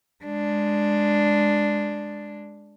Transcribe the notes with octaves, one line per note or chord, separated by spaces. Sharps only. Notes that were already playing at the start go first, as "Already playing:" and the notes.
G#3 D4